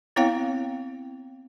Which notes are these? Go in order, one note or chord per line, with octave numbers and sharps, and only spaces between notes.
B3 C4 E4 C#5 F5 G5